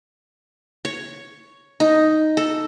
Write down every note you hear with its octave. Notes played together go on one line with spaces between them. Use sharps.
C#5
D#4
A4